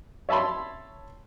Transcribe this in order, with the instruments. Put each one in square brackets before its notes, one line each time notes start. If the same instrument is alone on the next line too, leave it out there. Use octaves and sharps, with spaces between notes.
[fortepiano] C#5 E5 A5 B5 C6